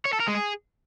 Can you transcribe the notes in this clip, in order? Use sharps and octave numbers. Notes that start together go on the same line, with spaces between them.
C#5
A4
A#4
G#3
G#4